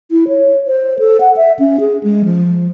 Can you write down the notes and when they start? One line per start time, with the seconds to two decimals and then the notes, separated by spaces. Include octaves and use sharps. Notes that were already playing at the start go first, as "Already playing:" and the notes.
0.11 E4
0.28 C#5
0.67 C5
0.99 A4
1.20 F#5
1.37 E5
1.59 C#4
1.80 G#4
2.03 G#3
2.25 F3